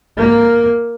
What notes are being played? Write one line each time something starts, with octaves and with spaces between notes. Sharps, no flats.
A#3